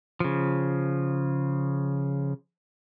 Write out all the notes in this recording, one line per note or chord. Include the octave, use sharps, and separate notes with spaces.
C#3 F3